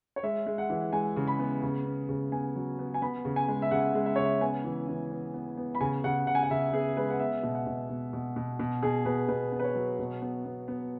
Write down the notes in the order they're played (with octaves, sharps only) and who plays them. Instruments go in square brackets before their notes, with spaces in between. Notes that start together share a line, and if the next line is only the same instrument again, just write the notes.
[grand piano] C#5
G#3 E5
G#3
F#5
E3
G#3 G#5
C#3
B5
B3
C#3
B3
C#3
B3 G#5
F#3
B3
G#5
B3 B5
C#3
G#5
G#3
E5
C#3 F#5
G#3
E5
C#3 C#5
E5
B3 G#5
E3
E3
B3
B3
B3
B5
C#3 G#5
C#3 F#5
C#3 F#5
G#5
F#5
C#3 E5
B3 G#4
G#3 B4
F#5
B3 E5
B2
F#5
B2
B2
B2
B2
B2
B2 G#4
B2 B4
B2 B4
B3
B4
C#5
F#3
B2
B3
B3
B3